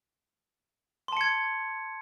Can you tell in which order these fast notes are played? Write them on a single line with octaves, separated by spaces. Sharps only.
C6 A5 C#7 G#6